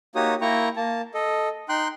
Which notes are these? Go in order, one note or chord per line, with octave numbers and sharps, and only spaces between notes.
A#3 D#4 F#4 G4 C#5 D#6
A#3 E4 G5 A#5 C#6
A#3 A5
A4 D#5
D#4 G5 C6 F#6